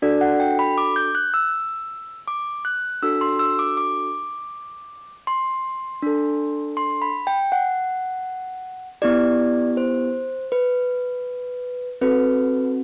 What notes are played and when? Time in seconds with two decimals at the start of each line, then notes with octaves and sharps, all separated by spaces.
0.02 D4 F#4 A4 D5
0.21 F#5
0.40 G5
0.59 B5
0.78 D6
0.96 G6
1.15 F#6
1.34 E6
2.28 D6
2.65 F#6
3.03 D4 F#4 A4 E6
3.21 C6
3.39 E6
3.59 D6
3.77 D6
5.27 C6
6.02 D4 A4
6.77 C6
7.02 B5
7.27 G5
7.52 F#5
9.02 B3 E4 G4 D5
9.77 C5
10.52 B4
12.01 C4 F#4 A4 B4